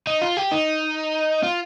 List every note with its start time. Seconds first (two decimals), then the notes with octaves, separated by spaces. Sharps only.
0.07 D#4
0.22 F4
0.37 G4
0.52 D#4
1.43 F4